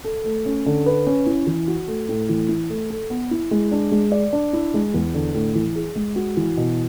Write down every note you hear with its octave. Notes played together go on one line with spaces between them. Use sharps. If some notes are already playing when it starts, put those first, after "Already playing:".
A4
A3
C#4
D3
B4
C#4
E4
E3
F#4
A3
A2
E3
E4
A3
A4
B3
E4
G#3
D4
G#3
D5
D4
E4
G#3
E2
D3
A2
E3
G#4
G#3
F#4
E3
B2